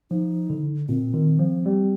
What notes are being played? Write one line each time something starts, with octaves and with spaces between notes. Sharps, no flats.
F3 D#4
D3
A#2 C4
D#3
F3
G3